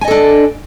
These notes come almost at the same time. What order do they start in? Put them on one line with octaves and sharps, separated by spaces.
G#5 D#5 A4 D4